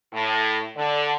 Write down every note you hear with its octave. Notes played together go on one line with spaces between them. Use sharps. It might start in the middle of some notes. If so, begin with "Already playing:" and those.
A2
D3